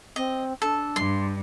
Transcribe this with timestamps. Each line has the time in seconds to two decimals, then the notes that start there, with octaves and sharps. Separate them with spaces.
0.16 C4 D#5
0.62 D4 A4
0.96 G2 C6